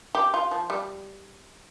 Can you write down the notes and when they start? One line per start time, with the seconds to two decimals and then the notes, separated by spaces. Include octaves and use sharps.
0.15 G4
0.34 F4
0.51 F3
0.70 G3